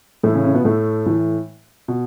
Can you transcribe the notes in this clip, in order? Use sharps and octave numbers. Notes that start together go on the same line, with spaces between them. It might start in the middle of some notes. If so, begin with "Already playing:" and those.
A2 E3 A3
C#3 C#4
C#3 C#4
B2 B3
A2 A3
A2 E3
B2